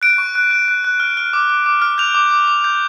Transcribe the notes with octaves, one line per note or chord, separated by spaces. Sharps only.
F#6 D7
C#6
F#6
F#6
F#6
F#6
F6
F6
D6
D6
D6
F6
G6 F7
D6
D6
D6
G6